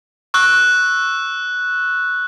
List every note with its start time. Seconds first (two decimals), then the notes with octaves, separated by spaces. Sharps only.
0.34 C#6 E6 F#6